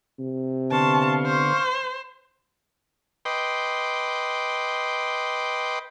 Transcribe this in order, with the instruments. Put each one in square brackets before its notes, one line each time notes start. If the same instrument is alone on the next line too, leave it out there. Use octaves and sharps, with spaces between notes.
[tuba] C3
[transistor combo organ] D3 B3 [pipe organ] F5 C6 C#6 [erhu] A5
[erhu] C5
[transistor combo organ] B4 D#5 G5 C6 D6